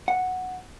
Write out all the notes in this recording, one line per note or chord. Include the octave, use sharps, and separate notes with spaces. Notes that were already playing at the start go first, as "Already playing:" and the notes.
F#5